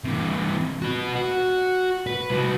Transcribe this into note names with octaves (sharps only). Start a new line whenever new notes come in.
C3 E3
F#4 B4
F#4
B4
C2 F#4